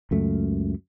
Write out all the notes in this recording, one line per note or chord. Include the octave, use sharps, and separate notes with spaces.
C#2 F#2 A3